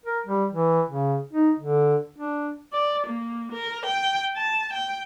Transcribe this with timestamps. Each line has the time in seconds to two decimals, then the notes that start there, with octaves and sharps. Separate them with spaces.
0.06 A#4
0.27 G3
0.52 E3
0.90 C#3
1.33 D#4
1.60 D3
2.18 D4
2.73 D5
3.07 A#3
3.52 A#4
3.86 G5
4.36 A5
4.74 G5